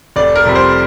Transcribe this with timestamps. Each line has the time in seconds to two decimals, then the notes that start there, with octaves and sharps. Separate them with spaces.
0.16 F1 D5
0.36 A#4
0.45 F2 C3 G3
0.55 C5